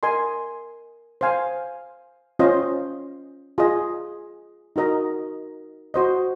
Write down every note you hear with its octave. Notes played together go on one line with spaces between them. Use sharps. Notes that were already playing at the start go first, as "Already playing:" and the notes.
A#4 D#5 G#5 C6
C5 F5 G#5
C#4 F4 C5 D#5
F4 G#4 D#5
D#4 F#4 A#4 D#5 A#5
F#4 C5 D#5